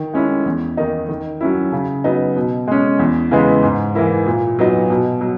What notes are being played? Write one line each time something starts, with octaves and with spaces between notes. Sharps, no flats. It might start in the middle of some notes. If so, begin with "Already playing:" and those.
Already playing: D#3
G#3 C#4 E4
E2
D#3 A#3 D#4
D#3
F#3 C#4 E4
C#3
F#3 B3 D#4
B2
G#3 C#4
E2
C#3 E3 G#3 B3
G#2
E3 A#3 E4
A#2
F#3 B3 D#4
B2
F#3